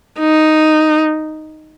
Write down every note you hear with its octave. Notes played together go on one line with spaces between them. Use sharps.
D#4